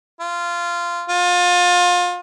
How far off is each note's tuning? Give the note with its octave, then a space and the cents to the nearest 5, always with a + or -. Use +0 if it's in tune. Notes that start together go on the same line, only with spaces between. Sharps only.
F4 -15
F4 +30